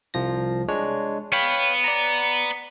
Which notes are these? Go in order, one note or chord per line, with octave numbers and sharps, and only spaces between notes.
C2 F3 A#6
G#3 D4 C#5
B3 C#5 F5 G5 B5
D5 A#5